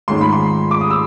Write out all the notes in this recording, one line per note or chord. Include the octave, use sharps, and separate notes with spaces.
G#2 D#3 G#3 C#4 C6
B5
C6
D6
D#6
E6